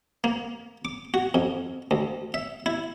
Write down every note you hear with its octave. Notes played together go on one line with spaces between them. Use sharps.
A#3
D6
F#4
F2
D2
E5
E4